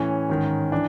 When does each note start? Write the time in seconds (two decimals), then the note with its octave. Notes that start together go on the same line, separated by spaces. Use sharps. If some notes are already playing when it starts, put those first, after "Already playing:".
Already playing: A2 E3 C#4
0.29 G#2 D#3
0.72 E3 D4